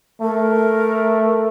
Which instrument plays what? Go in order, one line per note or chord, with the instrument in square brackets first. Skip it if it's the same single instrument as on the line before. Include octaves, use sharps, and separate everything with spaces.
[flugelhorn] A3 [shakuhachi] A#4